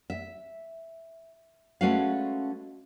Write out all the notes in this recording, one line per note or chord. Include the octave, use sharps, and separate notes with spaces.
E5
G#3 A3 C#4 F#4 B4 F5